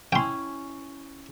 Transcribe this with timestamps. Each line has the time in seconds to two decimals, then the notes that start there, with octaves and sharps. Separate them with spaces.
0.12 C#4 E4 G5 C6